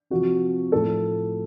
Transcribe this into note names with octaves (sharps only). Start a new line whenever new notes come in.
C3 F3 C4 F#4
A2 F3 A3 A4